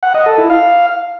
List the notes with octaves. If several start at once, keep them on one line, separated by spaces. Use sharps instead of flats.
F#5
D#5
A4
E4
F5